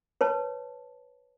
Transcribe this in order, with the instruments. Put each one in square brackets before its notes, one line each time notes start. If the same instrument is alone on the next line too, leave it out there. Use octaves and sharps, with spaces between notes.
[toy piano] B4 C#5 A5